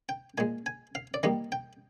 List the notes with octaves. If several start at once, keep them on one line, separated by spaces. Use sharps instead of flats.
G5
A#2 G#3 G#5
G#5
F5
D5
D#3 G3 A#3 D#5
G5